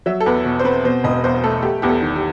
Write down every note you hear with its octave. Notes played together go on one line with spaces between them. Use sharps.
F#3 E5
A4
E2 B4
B2
C5
C4 B4
B2 C5
E1 D#5
E2 C5
A3 A4
A3 G4
E2 G4
A4
D#3
G4